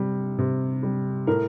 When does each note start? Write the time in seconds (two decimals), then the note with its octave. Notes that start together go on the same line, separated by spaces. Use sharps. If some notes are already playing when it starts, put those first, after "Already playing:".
Already playing: C3 G3
0.38 C3
0.83 G3
1.27 A2 A#4